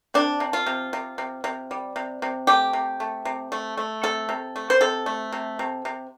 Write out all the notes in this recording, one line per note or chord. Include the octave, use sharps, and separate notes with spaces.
C3 D4
C3
F4
C3
C3
C3
C3
G3
C3
C3
A3 G4
C3
A3
C3
A3
A3
C3 A4
C3
A3
C5
C3 A4
A3
C3
C3
C3